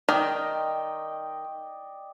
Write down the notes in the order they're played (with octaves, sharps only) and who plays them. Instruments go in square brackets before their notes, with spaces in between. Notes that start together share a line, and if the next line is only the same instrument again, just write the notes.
[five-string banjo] D#3 [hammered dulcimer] D5 D#5 G5